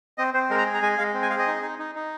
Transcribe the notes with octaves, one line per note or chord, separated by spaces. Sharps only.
C4 D#5
C4 C5
G#3 A#4
A#5
G#4
A#5
G#3 G#5
G#3 F5
C4
G#5
G#4 F5
D#5
D#4
D#4
D#4
D#4